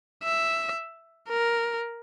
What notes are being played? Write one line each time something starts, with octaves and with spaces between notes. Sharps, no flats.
E5
A#4